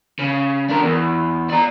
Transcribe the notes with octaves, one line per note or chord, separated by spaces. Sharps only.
C#3
D4 A#4
E2
D5 A#5